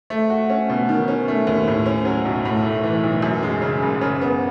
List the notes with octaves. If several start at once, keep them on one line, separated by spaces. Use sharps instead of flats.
A3
F#4
C#4
B2
D#3
C#4
A3
D#2
A2
C#4
F#3
B1
A2
A3
E3
B1
F#2
G#3
C#3
F#1
C#3
B3